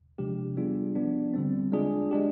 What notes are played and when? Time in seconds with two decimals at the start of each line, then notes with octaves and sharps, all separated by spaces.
0.18 C3 F3 G#3 D4 G4
0.57 G3 B3 D4 F4 G#4
0.95 F3 B3 D4
1.34 D3 G3 C4
1.72 G#3 D4 F4 G#4
2.11 G#3 D4 G4